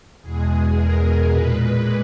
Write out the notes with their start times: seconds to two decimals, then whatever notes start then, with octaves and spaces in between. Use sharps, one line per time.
0.21 E2 B2 G#3 G#4
0.75 A#4
1.27 A#2 G#3 B4